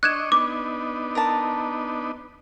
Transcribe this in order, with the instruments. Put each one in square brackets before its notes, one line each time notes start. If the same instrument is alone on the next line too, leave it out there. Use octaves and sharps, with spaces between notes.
[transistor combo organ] D4 D#5 C#6 [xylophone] F#6 G#6 E7
[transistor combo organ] B3 D4 D#4 [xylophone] D6
[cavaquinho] A#4 A5